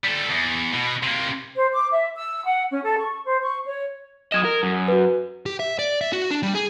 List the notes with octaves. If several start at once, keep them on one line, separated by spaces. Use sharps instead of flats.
G3 A4
E2
B2
C3 A#3
C5
D6
E5
E6
F#5
C#4
A4
C#6
C5
C#6
C#5
F#3 D#5 D#6 G#6 E7
A#4
F#2
F#4 B4
G4
E5
D5
E5
F#4
D4
G3
G#4